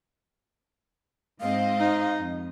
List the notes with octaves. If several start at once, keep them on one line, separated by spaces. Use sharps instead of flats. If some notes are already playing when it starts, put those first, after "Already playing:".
G#2 C4 D#5 F5
D#4
F2